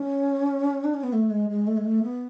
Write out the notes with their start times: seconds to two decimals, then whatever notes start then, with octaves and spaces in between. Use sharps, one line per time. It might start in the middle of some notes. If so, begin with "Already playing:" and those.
Already playing: C#4
0.84 D4
0.94 C#4
1.03 B3
1.13 A3
1.30 G#3
1.50 G#3
1.67 A3
1.77 G#3
1.85 A3
2.03 B3